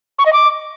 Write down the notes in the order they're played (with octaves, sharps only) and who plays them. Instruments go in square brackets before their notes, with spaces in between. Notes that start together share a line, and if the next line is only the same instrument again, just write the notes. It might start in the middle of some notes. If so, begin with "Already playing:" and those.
[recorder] C#6
D#5
D6